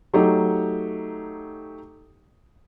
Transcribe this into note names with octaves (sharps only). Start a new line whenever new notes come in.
F#3 A3 D#4 G4